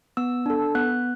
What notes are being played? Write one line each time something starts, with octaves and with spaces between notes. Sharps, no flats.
B3 E6
D4 A4
B3 F#6